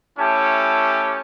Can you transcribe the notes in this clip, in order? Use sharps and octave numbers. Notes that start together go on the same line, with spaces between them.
A3 C#4 E4 G4 A5